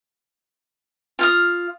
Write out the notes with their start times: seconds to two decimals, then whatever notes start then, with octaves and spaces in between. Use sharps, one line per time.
1.19 F4 F5 D#6